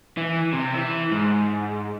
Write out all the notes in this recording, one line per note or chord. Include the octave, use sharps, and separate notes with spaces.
E3
C3
E3 E4
G#2